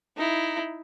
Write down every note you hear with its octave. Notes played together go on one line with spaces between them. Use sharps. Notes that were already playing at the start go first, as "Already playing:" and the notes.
D#4 E4